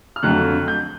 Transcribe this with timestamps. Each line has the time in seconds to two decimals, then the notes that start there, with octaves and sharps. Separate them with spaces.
0.16 F6
0.23 F2 D3 F#3 A3 F#6
0.68 G6